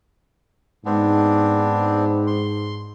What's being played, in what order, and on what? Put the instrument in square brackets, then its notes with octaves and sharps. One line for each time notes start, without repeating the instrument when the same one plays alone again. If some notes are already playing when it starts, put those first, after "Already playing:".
[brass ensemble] G#2 [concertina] B3 C4 D4
[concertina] C6